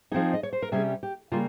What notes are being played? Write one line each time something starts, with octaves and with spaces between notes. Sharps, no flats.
F3 C4 D#4 G#4
D#5
C#5
C5
A#4
C3 G3 C#4 G#4
G4
C#3 G3 A#3 F4